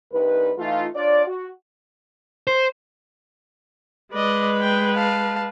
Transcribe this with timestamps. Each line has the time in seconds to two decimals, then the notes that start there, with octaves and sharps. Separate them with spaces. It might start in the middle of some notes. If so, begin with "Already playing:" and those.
0.12 C2 G2 D#4 B4
0.58 E3 A3 D#4 F4
0.94 D4 F4 C#5 D5
1.26 F#4
2.47 C5
4.13 G#3 B4 D5 D#5
4.60 G5
4.96 F5 A5